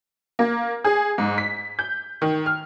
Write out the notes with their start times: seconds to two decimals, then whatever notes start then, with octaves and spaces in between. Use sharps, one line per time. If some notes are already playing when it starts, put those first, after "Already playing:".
0.39 A#3
0.84 G#4
1.18 G#2
1.38 B6
1.79 G6
2.22 D#3
2.46 F6